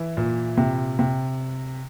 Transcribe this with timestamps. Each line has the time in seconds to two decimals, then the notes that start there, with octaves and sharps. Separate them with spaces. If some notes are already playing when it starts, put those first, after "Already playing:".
Already playing: E3 E4
0.17 A#2
0.57 C3
0.99 C3